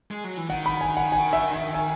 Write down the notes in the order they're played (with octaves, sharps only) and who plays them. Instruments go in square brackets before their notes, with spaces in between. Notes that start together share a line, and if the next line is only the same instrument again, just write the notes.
[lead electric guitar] G#3
F#3
E3
[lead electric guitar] D#3 [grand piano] F#5
[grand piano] B5
G#5
F#5
G#5
E5
G#5
G#5